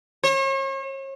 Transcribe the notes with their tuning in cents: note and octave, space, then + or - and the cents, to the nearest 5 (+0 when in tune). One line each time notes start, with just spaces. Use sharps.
C#5 -40